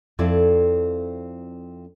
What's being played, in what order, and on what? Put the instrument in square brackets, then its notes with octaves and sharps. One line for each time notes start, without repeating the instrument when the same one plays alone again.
[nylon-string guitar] F2 C4 E4 A4 D5